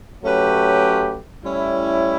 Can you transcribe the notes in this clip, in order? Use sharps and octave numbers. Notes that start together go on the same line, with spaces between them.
F#3 A3 C#4 G4 B4
A2 G3 C#4 E4